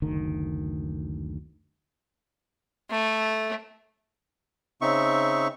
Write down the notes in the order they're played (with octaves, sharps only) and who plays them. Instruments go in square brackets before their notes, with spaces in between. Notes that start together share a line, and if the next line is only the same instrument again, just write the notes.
[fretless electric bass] F#1 D2 D#3
[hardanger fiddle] A3
[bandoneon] C#3 C4 D#4 E5 C#6